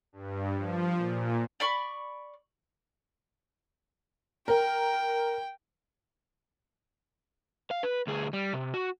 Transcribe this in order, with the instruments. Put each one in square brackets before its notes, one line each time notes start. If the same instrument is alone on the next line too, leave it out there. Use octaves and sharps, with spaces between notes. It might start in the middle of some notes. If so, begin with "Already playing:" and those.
[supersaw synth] G2
F3
A#2
[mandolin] D5 B5 C#6
[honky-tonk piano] A#4 [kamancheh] G5
[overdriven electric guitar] F5
B4
D2 G#4
G3
C3
F#4